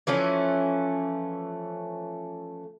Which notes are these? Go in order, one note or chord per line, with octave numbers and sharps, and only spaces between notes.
E3 F3 A3 C#4